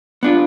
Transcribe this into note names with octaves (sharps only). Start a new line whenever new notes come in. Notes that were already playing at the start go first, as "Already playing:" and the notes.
B3 D4 F4